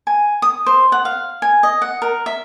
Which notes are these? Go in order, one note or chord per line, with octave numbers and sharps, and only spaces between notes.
G#5
D#6
C5
F#5
F5
G#5
D#5
F#5
A#4
E5